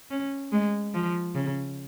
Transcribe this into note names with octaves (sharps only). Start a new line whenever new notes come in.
C#4
G#3
F3
C#3